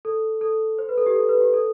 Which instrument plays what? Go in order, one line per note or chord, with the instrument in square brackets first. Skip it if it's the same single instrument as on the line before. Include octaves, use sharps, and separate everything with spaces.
[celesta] A4
A4
C5
B4
A4
G4
A4
B4
G4
A4